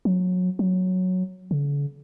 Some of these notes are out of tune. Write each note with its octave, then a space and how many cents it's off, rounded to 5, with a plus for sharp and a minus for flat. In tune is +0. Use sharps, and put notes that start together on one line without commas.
F#3 -25
F#3 -5
D3 -45